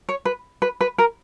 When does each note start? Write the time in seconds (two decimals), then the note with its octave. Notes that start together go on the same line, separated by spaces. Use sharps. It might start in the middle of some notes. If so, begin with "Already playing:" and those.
0.09 C#5
0.25 B4
0.62 B4
0.81 B4
0.98 A#4